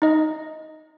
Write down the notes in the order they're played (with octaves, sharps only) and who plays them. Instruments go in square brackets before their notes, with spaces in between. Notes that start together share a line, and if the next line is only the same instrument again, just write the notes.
[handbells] D#4 D#5